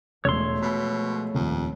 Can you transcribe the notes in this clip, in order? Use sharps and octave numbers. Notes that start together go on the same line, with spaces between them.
E1 F3 G#3 A3 C#5 C6 E6
B2 B5
D#1 F2